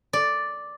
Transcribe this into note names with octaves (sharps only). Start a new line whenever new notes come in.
D5